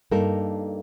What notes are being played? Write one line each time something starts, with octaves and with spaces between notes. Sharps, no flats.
G2 A#3 D#4 A4 A#4